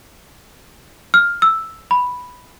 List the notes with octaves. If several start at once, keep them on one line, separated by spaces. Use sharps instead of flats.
F6
E6
B5